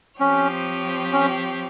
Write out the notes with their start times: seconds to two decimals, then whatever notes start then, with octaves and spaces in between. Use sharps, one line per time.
0.20 F3 C4 C#4 G4 C#5
1.13 C#4